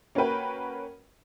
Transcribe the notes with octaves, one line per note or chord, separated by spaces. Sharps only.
A#3 C#4 F#4 A#4 B4 G5